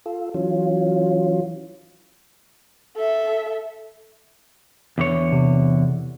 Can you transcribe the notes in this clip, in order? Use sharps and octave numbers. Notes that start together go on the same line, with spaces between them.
F4 A4
E3 F#3 C#4 F4
A4 E5
E2 D3 C#5
C3